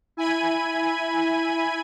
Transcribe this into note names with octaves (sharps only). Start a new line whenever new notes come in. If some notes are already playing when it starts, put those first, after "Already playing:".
E4 G#5 B5 G#6 D#7